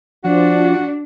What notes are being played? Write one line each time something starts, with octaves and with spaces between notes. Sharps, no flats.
F3 D4 F#4